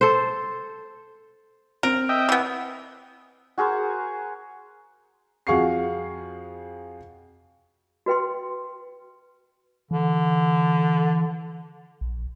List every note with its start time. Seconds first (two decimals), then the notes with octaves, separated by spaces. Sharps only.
0.01 A4 C5
1.83 C4 A#4 D7
2.09 D#5 E5 G5
2.29 E3 B3
3.58 F#4 G#4 A#4 C5
5.47 F2 F#4 G#4 F5 C#6 C7
8.06 F#4 B4 G5 C6
9.91 D3 E3
12.01 A#1